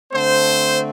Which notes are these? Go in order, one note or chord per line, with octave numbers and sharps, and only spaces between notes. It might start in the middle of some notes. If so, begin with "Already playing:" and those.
D3 A3 C4 C5